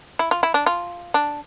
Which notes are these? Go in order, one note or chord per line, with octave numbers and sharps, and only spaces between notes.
E4
F4
E4
D4
F4
D4